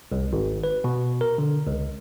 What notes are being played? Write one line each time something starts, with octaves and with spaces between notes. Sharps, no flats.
C2
G#1
B4
B2
A#4
D3
C#2